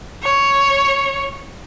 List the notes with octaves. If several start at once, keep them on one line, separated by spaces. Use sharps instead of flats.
C#5